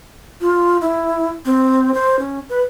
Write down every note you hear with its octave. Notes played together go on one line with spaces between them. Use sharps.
F4
E4
C4
C5
C#4
B4